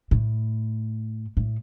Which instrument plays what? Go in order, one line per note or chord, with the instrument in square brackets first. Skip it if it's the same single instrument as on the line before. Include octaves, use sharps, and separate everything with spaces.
[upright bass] A2
A2